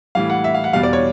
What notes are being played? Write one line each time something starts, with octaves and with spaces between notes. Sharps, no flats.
A2 E3 G3 F5
F#5
E5
F5
F#5
E2 B2 G3 F5
D5
C#5